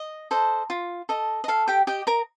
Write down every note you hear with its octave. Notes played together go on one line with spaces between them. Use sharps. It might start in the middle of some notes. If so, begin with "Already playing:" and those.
Already playing: D#5
A4 C5 D#5
F4
A4 D#5
D#5
A4 F5
G4 G5
G4 D#5 G5
A#4 A#5